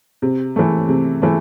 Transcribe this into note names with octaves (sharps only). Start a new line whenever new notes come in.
C3
E3 A3
C3
E3 A3